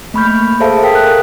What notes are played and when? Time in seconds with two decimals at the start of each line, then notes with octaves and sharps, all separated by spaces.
0.14 A3 A#3 B5 C#6 F6 G6
0.60 G#4 A4 C5 E5 F5 A5
0.82 A4 A#4 F5 G5 D#6 B6
0.95 F#6